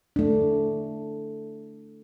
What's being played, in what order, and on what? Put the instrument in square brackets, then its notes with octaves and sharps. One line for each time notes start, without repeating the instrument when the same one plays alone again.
[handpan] A3 D4